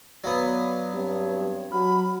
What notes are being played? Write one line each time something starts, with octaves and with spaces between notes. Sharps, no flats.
F#3 B3 D5 F5 B5
G2 C4 C#5
F#3 B5 F6